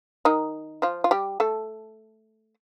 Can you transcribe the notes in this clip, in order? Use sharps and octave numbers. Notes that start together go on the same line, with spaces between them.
D#3 D#4
F3 F4
F4
G3 G4
A3 A4